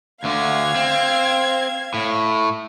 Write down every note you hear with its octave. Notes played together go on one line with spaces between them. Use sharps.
D2 D3 F5 G#6
C4
A2